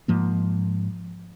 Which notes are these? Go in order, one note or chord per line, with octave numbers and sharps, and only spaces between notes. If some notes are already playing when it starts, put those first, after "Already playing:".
G#2 F3 A#3